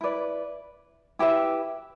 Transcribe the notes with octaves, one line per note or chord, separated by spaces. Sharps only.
E4 B4 D5
E4 G4 B4 E5